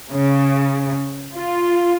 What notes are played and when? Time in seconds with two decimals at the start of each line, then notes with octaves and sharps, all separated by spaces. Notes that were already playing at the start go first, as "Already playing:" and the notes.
0.12 C#3
1.36 F4